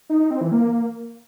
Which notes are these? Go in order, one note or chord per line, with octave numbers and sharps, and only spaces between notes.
D#4
D#4
C4
E3
A#3